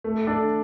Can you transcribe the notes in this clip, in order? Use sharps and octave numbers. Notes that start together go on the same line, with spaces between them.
A3
D4 A4 D5